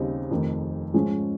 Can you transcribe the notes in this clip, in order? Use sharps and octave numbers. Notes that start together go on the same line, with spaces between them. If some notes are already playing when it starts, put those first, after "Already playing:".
Already playing: D#2 C#3 G3 C4 D#4
F1 F2 D#3
G#2 F3 G#3 C#4